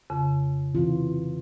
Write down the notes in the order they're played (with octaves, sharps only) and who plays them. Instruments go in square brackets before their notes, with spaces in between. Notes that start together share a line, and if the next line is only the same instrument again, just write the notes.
[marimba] F2 C#3
[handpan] C3 E3 F4